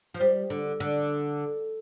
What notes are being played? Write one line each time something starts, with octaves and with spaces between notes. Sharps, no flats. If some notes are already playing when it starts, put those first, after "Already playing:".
F3
G3
D3
D3